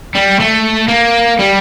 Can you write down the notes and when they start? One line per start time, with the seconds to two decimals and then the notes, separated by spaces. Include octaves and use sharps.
0.15 G3
0.40 A3
0.89 A#3
1.39 G3